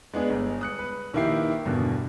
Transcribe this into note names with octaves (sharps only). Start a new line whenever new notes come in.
G#3 B3 D4 G#4
G1
D#6 F#6 C#7
B4
A#1 D#3 A#3 E4 G4 C7
E2 G2 B2 D3